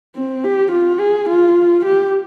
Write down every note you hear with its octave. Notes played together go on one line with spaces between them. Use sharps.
C4
G4
F4
G#4
F4
G4